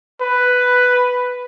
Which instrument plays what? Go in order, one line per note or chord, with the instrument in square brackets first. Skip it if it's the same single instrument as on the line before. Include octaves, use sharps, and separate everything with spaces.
[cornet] B4